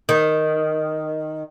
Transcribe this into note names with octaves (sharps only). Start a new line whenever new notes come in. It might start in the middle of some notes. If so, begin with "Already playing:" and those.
D#3